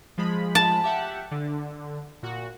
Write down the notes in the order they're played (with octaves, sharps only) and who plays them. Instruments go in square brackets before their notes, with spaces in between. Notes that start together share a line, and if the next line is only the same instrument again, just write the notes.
[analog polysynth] F3 G#3 B5
[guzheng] A5
[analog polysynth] G4 E5 F#5
D3
A#2 F#4